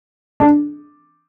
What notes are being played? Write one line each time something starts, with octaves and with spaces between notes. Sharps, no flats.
D4